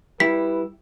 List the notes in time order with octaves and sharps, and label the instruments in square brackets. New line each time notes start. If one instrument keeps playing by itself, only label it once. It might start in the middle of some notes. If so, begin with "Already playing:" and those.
[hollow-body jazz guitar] G3 E4 [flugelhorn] B4 [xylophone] B6